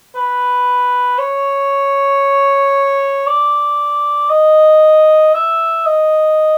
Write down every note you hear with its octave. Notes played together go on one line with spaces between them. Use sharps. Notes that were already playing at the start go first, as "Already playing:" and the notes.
B4
C#5
D5
D#5
E5
D#5